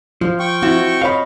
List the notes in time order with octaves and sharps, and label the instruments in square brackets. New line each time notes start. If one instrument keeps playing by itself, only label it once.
[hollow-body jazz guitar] F3 [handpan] F4
[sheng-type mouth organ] G5 C#6
[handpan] C4 [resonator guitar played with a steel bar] E4 F#4
[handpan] C#5 D#5 [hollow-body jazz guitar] F5 B5